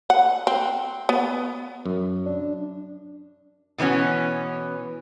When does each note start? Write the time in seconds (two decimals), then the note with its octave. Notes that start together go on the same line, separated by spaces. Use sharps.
0.10 F#5
0.47 C4
1.09 B3
1.86 F#2
2.26 D4
3.78 B2 E3 B3 C#4 F#4